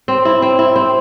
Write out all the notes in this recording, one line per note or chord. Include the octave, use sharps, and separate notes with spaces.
C4
E4
C4
E4
C4